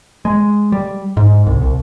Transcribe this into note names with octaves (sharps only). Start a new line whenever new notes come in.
G#3
G3
G#2
C2
C2